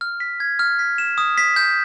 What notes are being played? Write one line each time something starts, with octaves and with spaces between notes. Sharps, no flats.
F6
B6
G#6
F6
B6
E7
D#6
B6
G6